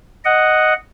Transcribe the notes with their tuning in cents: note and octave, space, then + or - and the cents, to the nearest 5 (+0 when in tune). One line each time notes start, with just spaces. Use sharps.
D#5 +0 F#5 +0